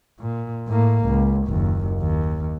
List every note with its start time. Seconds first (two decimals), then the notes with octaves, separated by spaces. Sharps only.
0.20 A#2
0.68 A2 A#3
1.06 C#2
1.48 F#1 D#2
2.01 D#2